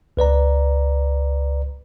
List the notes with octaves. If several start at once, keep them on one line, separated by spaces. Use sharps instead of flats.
C#2 B4 D5 A#5